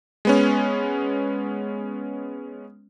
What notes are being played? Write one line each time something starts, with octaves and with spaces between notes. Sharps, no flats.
G#3 B3 C#4